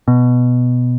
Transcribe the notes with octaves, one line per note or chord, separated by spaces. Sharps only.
B2